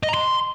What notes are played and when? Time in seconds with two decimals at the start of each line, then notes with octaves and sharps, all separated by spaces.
0.03 D#5
0.09 A#5
0.14 C6